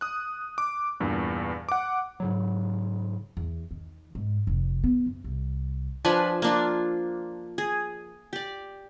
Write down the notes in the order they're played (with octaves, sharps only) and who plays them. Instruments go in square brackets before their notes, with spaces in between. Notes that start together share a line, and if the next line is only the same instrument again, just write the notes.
[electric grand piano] D#6 F#6
D6
E2 G2 A#2
F#5 D6
[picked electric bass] G#2 C#3 F#3
[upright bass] E2
D#3
G#2
F1
B3
F#1
C2
[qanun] F3 D4 B4 G#5
A#3 D4 F4
G#4
G4 D5